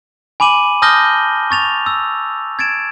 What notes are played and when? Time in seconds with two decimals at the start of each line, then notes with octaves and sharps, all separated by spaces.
0.40 G#5 B5 D6 D#7 F#7
0.82 A5 D#6 F6 G6 A#6 G7
1.51 C#6 A6 F7
1.86 E6
2.59 G#6 A6 D7 E7